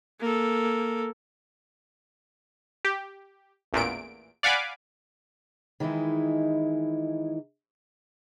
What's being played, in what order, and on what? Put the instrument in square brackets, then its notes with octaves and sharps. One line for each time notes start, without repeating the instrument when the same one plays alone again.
[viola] A#3 A4
[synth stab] G4
A1 E2 A#2 D7
D5 F5 F#5 G#5 B5 D6
[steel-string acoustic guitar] D#3 E3 G#3 D#4 E4